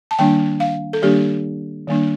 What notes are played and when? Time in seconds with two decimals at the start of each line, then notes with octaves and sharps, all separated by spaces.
0.11 A5
0.19 D#3 G3 A#3 D4 G5
0.60 F5
0.93 A4
1.02 D#3 G3 A#3 D4 G4
1.88 D#3 G3 A#3 D4